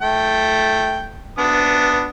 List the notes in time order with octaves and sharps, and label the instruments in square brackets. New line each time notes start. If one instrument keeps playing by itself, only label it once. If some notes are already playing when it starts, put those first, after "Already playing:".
[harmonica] A3 G5
B3 D4 D#6